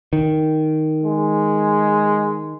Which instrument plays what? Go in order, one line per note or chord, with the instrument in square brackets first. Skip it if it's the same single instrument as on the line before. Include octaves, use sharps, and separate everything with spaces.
[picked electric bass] D#3
[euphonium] G#3